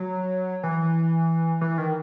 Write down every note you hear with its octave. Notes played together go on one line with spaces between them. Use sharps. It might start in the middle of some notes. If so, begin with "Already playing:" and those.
Already playing: F#3
E3
E3
D#3